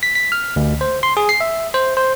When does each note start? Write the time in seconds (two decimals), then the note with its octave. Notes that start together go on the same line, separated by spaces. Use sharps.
0.03 B6
0.15 B6
0.32 F6
0.56 D2
0.81 C5
1.03 C6
1.17 G#4
1.29 C7
1.41 E5
1.74 C5
1.97 C5